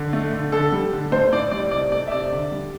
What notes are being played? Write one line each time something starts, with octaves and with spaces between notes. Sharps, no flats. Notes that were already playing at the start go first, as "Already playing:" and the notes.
Already playing: D3
A3
D3
D3 A4
G3
D3
A2 C5
A2 D5
G3 D5
C3 D5
A3 D5
E5
C3 D5
D3
G3